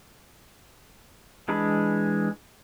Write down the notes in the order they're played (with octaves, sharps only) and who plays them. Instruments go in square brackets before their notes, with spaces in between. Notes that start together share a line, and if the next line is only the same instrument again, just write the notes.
[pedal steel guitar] E3 G#3 D4 B5